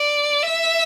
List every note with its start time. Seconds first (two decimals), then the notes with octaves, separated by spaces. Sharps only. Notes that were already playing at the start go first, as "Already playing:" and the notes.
Already playing: D5
0.43 E5